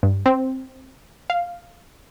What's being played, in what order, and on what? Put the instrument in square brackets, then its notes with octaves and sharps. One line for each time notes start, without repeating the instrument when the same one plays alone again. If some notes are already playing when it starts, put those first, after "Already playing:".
[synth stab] G2
C4
F5